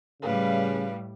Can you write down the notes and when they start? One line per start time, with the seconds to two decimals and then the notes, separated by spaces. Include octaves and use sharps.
0.22 A2 C#3 G3 B4 F5